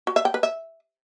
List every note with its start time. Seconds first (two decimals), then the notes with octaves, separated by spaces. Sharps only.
0.07 F#4
0.16 E5
0.25 G5
0.34 B4
0.43 E5